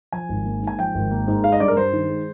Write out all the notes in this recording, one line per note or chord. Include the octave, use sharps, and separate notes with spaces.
F3 G#5
G#1
A#3
G#2
G#5
F3 G5
G#1
A#3
G#2
G#3 F5
D#5
G2 D5
A#4
G2 C5
D#3
G#3